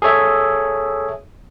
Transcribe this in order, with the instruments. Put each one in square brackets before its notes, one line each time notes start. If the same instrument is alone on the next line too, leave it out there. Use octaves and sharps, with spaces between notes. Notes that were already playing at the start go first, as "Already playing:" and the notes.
[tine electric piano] G#4 A4 C#5 E5